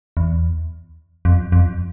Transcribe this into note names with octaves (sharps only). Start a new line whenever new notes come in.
E2
F2
F2